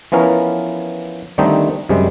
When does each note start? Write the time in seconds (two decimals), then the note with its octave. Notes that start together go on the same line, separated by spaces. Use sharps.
0.12 E3 F3 B3 C#4 A#4
1.38 D3 D#3 G3 A3 C4 D#4
1.89 F#2 C3 G3 G#3